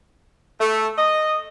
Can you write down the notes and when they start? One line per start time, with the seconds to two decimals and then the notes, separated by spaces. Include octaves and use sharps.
0.60 A3
0.97 D#5